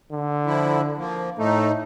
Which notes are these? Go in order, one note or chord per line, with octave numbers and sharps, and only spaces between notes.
D3
F3 E4
F3 A#3
A2 A3 D#4